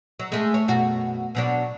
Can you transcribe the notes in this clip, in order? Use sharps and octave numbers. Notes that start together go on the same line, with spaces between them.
F#3
G#3 A3
C#5
F#2 B2 F#4
B2 F#3 D4